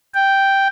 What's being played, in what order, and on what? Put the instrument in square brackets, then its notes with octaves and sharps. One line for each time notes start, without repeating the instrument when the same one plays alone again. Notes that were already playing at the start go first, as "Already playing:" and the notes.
[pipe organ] G5